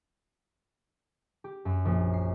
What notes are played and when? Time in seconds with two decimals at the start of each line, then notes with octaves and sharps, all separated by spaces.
1.44 G4
1.65 F#2
1.85 A#1
2.13 C7